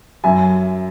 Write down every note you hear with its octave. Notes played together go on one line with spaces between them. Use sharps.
F#2 E5 G#5